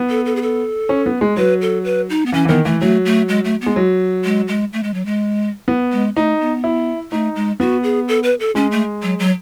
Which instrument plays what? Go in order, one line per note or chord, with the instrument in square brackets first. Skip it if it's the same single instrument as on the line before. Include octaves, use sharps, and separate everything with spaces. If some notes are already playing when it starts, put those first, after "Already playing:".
Already playing: [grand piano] B3
[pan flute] A4
A4
G#4
A4
[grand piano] C#4
B3
G#3
[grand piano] F#3 [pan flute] B4
[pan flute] A4
B4
D#4
B3
[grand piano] E3 [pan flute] C#4
[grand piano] E3
[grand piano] D#3 [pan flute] B3
[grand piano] E3 [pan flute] A3
[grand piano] F#3 [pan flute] A3
[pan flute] A3
G#3
A3
B3
[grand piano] G#3
F#3
[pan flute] G#3
G#3
A3
G#3
F#3
G#3
[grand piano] B3
[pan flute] G#3
[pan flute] A3 [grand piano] D#4
[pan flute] B3
[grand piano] E4
[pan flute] A3 [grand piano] D#4
[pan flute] G#3
[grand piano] B3 [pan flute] F#4
[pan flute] G#4
A4
B4
A4
[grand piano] G#3 [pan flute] C#4
[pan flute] A3
F#3
F#3